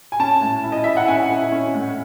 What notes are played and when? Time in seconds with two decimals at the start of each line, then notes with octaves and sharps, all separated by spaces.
0.12 G#5
0.20 C#4 A5
0.41 A2
0.64 E4
0.72 D#5
0.84 E4 E5
0.97 F#5
1.08 C#4 G#5
1.30 E4
1.52 C#4
1.74 A2